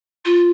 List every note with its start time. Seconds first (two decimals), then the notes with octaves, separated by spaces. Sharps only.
0.25 F4